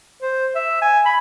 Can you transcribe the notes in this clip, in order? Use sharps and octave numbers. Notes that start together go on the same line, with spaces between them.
C5
E5
G#5
B5